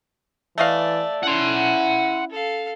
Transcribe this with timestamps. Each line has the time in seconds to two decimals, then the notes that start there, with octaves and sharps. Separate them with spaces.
0.58 E3 A3 D5 D#5 F5
1.23 C#4 E4 F#5 C6
2.30 A4 F5